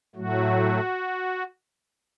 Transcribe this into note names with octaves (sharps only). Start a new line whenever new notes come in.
A2 F#3 A3 F#4